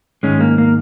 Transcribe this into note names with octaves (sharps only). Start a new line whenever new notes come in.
G#2 D#3 G#3 C#4
A#3
A#3